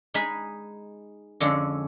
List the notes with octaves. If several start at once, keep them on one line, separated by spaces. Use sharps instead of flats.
G#3 D#4 G#4 B5
F2 D3 G#3 C#4